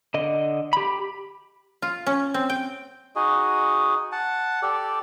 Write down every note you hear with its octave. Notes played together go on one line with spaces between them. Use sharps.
D3 D#5
G4 B5
F4
C#4
C4
G5
D#4 F#4 G#4 D#5
F#5 A5
G4 A4 D5